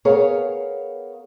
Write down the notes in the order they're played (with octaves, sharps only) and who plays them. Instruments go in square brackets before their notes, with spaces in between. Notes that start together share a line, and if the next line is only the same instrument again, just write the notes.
[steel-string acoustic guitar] B3 G#4 A#4 C#5 F5 A#5